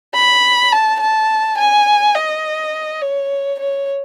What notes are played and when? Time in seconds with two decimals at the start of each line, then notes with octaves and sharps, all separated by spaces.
0.15 B5
0.72 A5
1.00 A5
1.58 G#5
2.15 D#5
3.01 C#5
3.59 C#5